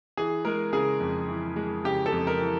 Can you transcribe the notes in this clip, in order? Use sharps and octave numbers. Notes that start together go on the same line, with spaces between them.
E3 G#4
G#3 A#4
C#3 G#4
F2
E3
G#3
C#3 G4
A4
F2
A#4
E3